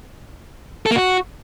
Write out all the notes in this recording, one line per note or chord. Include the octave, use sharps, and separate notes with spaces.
A4
A#3
F#4